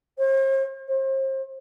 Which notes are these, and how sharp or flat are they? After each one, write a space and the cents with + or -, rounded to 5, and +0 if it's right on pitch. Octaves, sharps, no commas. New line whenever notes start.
C5 +45
C5 +35